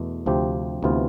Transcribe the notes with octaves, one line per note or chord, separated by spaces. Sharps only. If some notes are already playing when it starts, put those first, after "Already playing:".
Already playing: E2 B2 A3
D2 C3 F3 C4 G4
D2 C3 E3 B3 F4